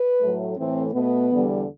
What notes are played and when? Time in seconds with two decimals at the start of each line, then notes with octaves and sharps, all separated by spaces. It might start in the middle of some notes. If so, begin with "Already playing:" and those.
Already playing: B4
0.21 A2 F#3 A3
0.57 A2 E3 A3 C4
0.93 B2 A3 B3
1.29 E2 D3 G3